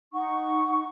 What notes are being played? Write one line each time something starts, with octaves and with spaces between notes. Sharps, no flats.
D#4 F#5 C#6